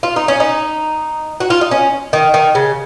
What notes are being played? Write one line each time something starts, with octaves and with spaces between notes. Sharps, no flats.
F4
D#4
C#4
D#4
F#4
F4
D#4
C#4
D#3
D#3
C#3